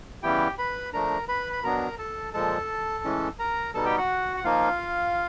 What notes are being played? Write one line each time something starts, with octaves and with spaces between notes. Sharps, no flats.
C#3 E3 G3 B3 E4 G4 G5
B4 B5
F3 A3 D4 A#4 A#5
B4 B5
B5
B2 F#3 B3 D4 A#4 A#5
A4 A5
A#2 F3 G#3 A4 A5
A2 E3 G#3 C#4
A#4 A#5
B2 G3 B3 D#4 A4 A5
G4 G5
F#4 F#5
F#5
F3 A#3 D#4 F4 F5